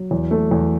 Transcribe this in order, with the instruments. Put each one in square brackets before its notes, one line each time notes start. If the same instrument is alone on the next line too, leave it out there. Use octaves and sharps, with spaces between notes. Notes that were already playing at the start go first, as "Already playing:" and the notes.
Already playing: [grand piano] F#3
E2
A3
E2